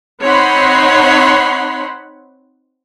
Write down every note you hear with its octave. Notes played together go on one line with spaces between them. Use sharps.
C4 D#4 C#5 F#5 B5 C6